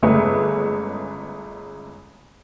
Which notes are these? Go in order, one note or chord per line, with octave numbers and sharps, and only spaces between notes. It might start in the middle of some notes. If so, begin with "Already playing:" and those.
G1 C#3 G#3 A3 G#4 B4